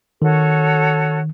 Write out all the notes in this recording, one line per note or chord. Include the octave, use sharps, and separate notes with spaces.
D#3 F#4 A4 C#5